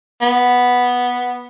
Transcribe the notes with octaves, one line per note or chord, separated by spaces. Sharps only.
B3